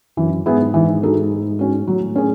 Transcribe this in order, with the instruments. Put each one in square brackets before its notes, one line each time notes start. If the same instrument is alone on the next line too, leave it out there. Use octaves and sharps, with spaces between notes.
[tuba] F#2 [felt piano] E3
[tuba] G#2 [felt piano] B3 E4 G#4
[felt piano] E3
G#3 D#4 F#4 A4
G#3
C#4 F#4
[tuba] A2 [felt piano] F#3
[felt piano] C#4 G#4